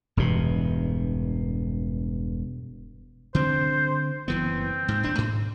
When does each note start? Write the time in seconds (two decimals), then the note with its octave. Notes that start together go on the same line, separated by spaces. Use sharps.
0.17 E1 G2 B2
3.35 D3 C4 C5
4.28 F#1 E3 B3 C4
4.88 G#2
5.03 D#1 D4
5.18 G#2